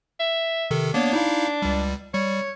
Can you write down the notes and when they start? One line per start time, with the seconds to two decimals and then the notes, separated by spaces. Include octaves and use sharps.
0.20 E5
0.71 C3 D#3 A4
0.94 A#3 B3 D4 C#5
1.13 D#4 E4 F5
1.62 C#2 G3
2.14 G3 C#5